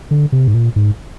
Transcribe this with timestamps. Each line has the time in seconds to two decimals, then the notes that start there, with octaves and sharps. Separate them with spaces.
0.11 D3
0.32 C3
0.48 G#2
0.54 A#2
0.76 G#2